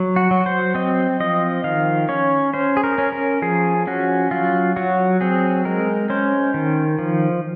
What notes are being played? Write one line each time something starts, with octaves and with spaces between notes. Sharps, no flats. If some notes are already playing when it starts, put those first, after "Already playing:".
Already playing: F#3
F#4
F#3
C5
C4 D#5
F3 D#5
D#3 F5
C#4 C#5
C#4 C5
G#4
A#4
C#4
A#4
F3 G#4
C#4 F#4
F#3 F4
F#3 F#4
C4 G#4
G#3 A#4
C#4 C5
D#3
F3